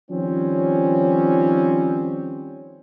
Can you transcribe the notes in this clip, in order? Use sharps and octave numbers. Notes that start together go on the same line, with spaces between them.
D#3 F3 G3 C4 C#4